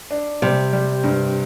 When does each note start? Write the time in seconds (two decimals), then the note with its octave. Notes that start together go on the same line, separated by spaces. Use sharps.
0.11 D4
0.42 C3 G3
0.73 G3
1.04 G2